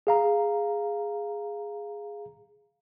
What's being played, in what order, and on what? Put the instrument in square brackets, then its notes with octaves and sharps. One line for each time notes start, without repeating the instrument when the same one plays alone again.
[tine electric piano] G#4 F5 A#5